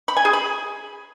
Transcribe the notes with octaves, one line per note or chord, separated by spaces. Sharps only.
B5
G#5
G#4
B5